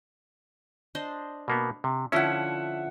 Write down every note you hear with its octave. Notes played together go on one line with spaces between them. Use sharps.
D4 C5 D#5
B2 A#3 B3
C3
D3 F3 C#4 D4 E4 E5 F#5